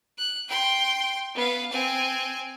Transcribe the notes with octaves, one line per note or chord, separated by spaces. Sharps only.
F#6
G5 C6
B3 F5
C4 G#5